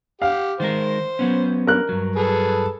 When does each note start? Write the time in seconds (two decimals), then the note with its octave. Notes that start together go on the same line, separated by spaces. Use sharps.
0.22 G4 F5 F#5
0.60 D#3 G#3 A#4 C5
1.19 F#3 B3 C#4
1.67 A#4 F#6
1.89 G2 F#3
2.16 G#4 A4 B4